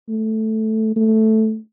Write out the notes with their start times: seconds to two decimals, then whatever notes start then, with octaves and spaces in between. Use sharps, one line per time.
0.09 A3
0.96 A3